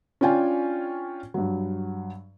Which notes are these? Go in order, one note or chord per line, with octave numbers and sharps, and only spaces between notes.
C#4 D4 F4 G5 G#5
G2 F#3